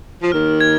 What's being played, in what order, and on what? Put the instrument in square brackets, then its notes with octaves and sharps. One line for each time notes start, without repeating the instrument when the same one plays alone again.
[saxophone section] F3
[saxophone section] D#2 D#3 [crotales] F6
[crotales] G#6